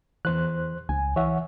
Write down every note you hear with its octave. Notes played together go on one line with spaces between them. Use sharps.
E2 E3 C5 F#6
C#2 G#5
E3 C#5 E5 F#5